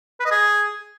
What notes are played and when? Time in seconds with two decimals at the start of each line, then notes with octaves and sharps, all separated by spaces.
0.20 B4
0.25 D#5
0.31 G#4